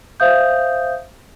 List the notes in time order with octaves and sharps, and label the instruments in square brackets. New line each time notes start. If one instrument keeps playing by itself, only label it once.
[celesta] C5 E5 F5 D#6 G6